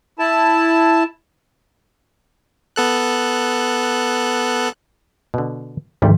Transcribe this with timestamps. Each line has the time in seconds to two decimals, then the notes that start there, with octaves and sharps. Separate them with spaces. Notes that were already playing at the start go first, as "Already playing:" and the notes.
0.19 E4 A5
2.76 B3 A4 F#6
5.34 B2 D3
6.02 G#1 D2 G#2 D#3 F3 G3